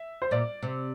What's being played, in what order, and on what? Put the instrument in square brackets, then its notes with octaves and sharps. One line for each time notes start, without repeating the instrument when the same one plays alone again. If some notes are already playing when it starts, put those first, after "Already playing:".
Already playing: [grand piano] E5
C5
[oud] A#2 [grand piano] D5
[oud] C3